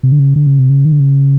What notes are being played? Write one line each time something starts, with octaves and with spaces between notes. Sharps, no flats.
C3
D3
C#3
D3
C#3
C3
C#3
D#3
D3
C#3